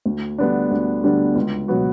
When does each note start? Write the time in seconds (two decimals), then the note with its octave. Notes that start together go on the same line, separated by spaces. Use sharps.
0.06 D2
0.38 D3 G3 B3 D4
0.71 D2
1.04 D3 G3 B3 D4
1.35 C#2
1.68 B2 F#3 B3 F#4